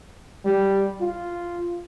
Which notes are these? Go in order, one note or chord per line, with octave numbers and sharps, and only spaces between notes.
G3
F4